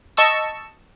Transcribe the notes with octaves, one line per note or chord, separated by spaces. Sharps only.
D#5 A5 C#6 E6